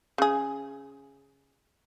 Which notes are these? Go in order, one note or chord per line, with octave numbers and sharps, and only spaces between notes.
C#3 G#4